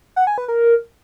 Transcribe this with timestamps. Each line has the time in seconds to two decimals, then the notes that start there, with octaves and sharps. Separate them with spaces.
0.16 F#5
0.27 G#5
0.38 B4
0.48 A#4